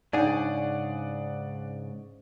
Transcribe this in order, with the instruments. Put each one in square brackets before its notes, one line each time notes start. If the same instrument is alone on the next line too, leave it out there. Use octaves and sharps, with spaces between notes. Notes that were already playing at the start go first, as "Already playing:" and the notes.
[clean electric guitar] G#2 C#3 G#4 [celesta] D4 D#4 [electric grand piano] D5 F#5